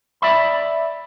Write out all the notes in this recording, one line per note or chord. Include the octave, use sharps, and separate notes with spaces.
D5 E5 B5